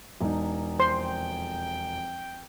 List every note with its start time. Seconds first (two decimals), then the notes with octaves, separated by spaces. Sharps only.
0.21 E1 D#4
0.80 F2 C5 G5 C6